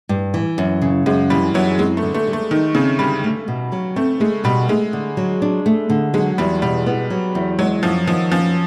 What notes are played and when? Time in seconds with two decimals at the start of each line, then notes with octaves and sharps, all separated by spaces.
0.09 G2
0.34 E3
0.58 F#2
0.82 C#3
1.06 F#2 G#3
1.30 E3 G3
1.54 F#2 F#3
1.78 G#3 C4
1.97 A3
2.03 D3
2.14 A3
2.27 G3
2.33 A3
2.51 D#3 D#4
2.75 C#3 C4
2.99 D3 G3
3.24 A3
3.48 B2
3.72 F#3
3.96 A3 C4
4.20 G#3 A3
4.44 B2 G3
4.68 G#3 A3
4.93 D3
5.17 F#3
5.42 D4
5.66 A3
5.90 D3
6.14 F#3 G#3
6.38 E2 G3
6.62 B2 G3
6.86 B3
7.10 F#3
7.35 E2
7.59 F#3 G#3
7.83 F#2 F3
8.07 D#3 F3
8.32 F3 C#4